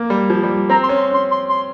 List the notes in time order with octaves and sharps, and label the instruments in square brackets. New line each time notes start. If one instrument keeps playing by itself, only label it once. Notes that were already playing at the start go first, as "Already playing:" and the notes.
Already playing: [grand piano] A#3
G3
F3
G3
[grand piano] C4 [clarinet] A#5
[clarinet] C6
[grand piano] C#4
[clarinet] C6
[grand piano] C#4 [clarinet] C6
[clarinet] C6
C6